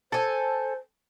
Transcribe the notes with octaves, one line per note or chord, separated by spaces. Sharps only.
A4 C5 G#5